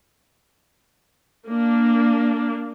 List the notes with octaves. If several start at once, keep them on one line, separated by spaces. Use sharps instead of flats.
A#3 D4